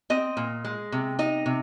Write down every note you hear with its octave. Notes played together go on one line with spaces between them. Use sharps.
C4 D#5
A#2
G#3
C3
D#4 D#5
C3